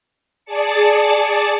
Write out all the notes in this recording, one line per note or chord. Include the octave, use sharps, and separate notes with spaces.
G#4 D5 A5 C#7